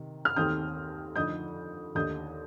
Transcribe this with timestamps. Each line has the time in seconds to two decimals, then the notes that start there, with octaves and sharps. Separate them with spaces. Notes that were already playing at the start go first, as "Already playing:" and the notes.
Already playing: C3 D#3
0.25 F6
0.36 D#2 D#3 A3 C4 D#4 D#6 G6
1.16 F2 D3 A3 D#4 D#6 G6
1.95 D#2 D3 A3 D#4 D#6 G6